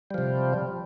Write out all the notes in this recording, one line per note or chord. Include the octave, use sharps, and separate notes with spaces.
C3 F3 G3